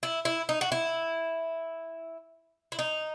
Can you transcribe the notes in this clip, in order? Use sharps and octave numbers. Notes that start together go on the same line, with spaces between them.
E4
E4
D#4
F#4
E4
E4
D#4